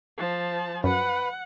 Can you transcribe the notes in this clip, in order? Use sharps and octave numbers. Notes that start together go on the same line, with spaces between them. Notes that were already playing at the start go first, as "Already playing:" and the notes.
F3 A5
F#2 B4 F#5